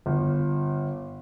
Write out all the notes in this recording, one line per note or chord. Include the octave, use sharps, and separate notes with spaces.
G1